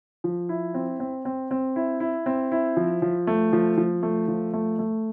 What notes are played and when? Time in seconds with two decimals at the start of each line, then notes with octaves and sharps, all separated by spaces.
0.24 F3
0.49 E4
0.74 C4
1.00 C4
1.25 C4
1.51 C4
1.76 E4
2.00 E4
2.26 C4
2.52 E4
2.77 F3
3.02 F3
3.27 A3
3.53 F3
3.77 F3
4.03 A3
4.28 F3
4.53 A3
4.79 A3